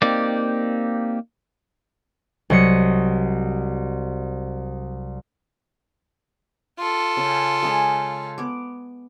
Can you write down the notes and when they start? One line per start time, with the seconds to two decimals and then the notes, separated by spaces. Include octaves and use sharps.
0.02 A#3 C4 D#4 G4 D5
2.50 C2 F#3 D#5 C#7
6.78 F4 A4
7.17 C#3
7.63 C#3 G#3 G#4
8.38 B3 D6